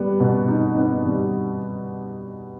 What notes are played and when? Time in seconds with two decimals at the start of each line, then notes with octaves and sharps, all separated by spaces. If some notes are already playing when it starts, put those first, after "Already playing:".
Already playing: G3 B3
0.20 B2
0.48 D#4
0.77 B3
1.05 G3